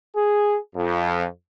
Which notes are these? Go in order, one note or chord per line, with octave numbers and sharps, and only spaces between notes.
G#4
F2